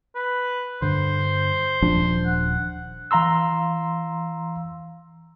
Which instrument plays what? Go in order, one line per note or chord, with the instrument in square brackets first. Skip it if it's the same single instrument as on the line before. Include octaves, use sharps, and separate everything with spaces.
[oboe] B4
[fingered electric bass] G2 D3 [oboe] C5
[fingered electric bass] D#1 F3 D4
[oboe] F#5
[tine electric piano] E3 F5 A#5 C6 E6